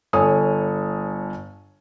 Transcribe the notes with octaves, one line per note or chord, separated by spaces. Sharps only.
G1 A4 C#5 G#5 D#6